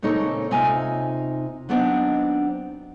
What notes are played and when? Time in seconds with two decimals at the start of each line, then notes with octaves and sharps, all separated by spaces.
0.02 A#2 C#3 C4 D#4 A4 C#5
0.51 C3 D#4 F4 G#5
1.69 F#3 B3 C4 D4 D#4